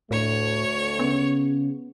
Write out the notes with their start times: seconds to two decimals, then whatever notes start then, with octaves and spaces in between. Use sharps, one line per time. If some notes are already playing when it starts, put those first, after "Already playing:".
0.11 D2 A2 A3 C#5
0.99 C#3 B3